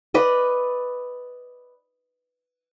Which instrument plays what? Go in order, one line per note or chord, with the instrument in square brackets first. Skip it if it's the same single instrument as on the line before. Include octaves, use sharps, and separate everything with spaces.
[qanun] B4 D5 D#5